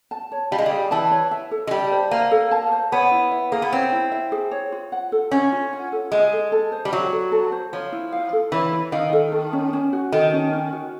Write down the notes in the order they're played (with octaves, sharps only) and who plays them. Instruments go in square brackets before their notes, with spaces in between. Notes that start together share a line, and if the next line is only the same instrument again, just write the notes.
[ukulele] A5
C#5
[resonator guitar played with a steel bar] G3 [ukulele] F5
[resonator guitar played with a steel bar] G#3
G3
[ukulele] G#4
[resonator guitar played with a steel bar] E3 [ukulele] A5
[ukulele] C#5
E5
A4
[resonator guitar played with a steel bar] G#3
[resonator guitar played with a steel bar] G3 [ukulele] A5
[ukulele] C5
[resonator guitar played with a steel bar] A#3 [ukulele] E5
[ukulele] A4
A5
C5
[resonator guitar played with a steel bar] B3 [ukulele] C#5
[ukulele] E4
E5
[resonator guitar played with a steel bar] A#3 [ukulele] G#4
[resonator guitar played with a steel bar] B3
[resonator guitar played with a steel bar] C4 [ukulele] C#5
[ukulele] E4
E5
G#4
C#5
F4
F#5
A4
[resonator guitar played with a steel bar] C#4 [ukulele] C#5
[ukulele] F4
F#5
A4
[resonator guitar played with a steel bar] G#3 [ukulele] E5
[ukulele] A4
A4
C5
[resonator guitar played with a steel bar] G3
[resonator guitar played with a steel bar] F#3 [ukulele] E5
[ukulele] A4
A4
C5
[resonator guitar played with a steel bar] F3 [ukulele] C#5
[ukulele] E4
F5
A4
[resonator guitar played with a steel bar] E3 [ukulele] C#5
[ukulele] E4
[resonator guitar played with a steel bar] D#3 [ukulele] F5
[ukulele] A4
A4
C#4
C#4
F#4
[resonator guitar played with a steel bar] D#3 [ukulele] A4
[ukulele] C#4
C#4
F#4